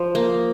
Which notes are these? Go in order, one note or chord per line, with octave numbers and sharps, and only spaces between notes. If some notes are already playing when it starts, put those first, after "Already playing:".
Already playing: F3
A#3